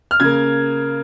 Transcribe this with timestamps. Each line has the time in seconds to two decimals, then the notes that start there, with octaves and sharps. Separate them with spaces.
0.11 F6
0.20 C#3 A#3 G#6